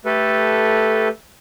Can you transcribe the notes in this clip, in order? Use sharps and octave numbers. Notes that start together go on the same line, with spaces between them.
A3 G4 A4 B4